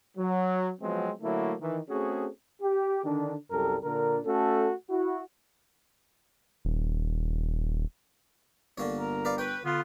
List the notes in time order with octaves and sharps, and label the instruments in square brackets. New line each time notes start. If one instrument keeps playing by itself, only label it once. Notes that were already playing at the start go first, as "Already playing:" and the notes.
[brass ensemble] F#3
F3 F#3 G#3 B3 C4
D3 F#3 A3 A#3 E4
D#3 E3
A3 C4 C#4 F#4 G#4
[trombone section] G4
D3 D#3 D4
C2 F#2 G3 A4 A#4
A#2 D3 D4 A#4
A3 C#4 F#4 A4
E4 F#4
[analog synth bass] D#1
[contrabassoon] G1 [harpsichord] D3 A#3 C#5
[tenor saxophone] A#4
[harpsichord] B4 D5 F5
[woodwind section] B4 G5 [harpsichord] C#5
[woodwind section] D3 B3 [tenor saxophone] F4